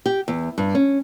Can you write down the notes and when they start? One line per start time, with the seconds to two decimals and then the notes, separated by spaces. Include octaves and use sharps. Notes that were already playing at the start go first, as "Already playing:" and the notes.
0.06 G4
0.28 E2
0.58 G2
0.75 C#4